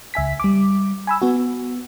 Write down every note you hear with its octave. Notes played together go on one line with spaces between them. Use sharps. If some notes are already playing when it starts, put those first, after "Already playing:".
C#2 E5 G#5 B6
G3 D6
G#5 B5 E6
B3 F#4